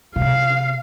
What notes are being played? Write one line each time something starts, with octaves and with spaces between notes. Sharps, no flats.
C3 F5